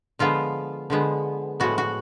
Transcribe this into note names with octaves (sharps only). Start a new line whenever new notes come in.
D3 F3 G#3 B3 F4
D3 F3 G#3 B3
A2 F3 G#3 B3 F#4
F#4